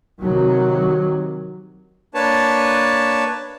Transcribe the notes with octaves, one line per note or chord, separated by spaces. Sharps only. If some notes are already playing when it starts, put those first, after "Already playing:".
C3 D#3 F#3
A#3 D4 B4 C#5 A5